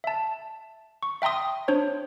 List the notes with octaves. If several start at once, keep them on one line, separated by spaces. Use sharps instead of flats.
E5 A5
C#6
E5 G5 A#5 C6 D#6
D4 C5 C#5